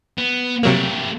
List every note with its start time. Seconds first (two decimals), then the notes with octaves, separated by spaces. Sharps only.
0.18 B3
0.63 C3 F#3 A3 A#3 G4